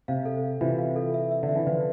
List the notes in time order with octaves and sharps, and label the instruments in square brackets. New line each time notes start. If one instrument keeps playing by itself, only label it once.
[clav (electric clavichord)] C3 [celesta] F5
[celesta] A4
F5
[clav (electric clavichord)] C3 E3 [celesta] F4
[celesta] F5
A4
E5
E5
[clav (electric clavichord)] D3
[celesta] E5
[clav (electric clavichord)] E3
[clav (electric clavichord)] D3 F3 [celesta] B4